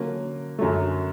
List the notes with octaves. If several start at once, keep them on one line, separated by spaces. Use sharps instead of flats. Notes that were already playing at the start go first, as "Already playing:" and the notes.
Already playing: D3 F#3 A#3 C#4
F#2 D3 F#3 A3